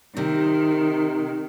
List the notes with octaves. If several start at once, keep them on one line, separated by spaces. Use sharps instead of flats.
C3 D#3